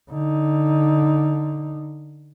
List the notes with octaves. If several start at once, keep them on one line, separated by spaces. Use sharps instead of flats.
D3 D#4